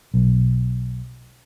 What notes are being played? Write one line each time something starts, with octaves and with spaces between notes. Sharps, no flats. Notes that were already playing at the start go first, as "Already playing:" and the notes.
B1